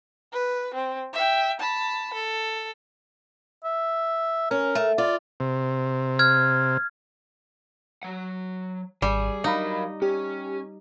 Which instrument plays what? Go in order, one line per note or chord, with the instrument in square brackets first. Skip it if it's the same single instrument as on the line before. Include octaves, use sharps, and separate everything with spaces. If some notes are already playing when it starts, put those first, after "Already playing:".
[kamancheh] B4
C4
E5 G5
A5 B5
A4
[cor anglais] E5
[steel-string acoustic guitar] C#4 [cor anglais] A#4
[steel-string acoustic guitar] A3
[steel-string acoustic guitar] F4 [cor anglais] D5
[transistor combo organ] C3
[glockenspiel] F6 G#6
[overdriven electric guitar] F#3 F#5
[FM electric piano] G#1 [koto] G3 [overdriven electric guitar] G#4
[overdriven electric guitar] F#3 A#4 [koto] D#4 [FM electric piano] D#5 F5 B5
[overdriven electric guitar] C#4 [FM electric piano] G4